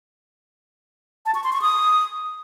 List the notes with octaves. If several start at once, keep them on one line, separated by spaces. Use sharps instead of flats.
A5
C#6
C6
C#6
D#6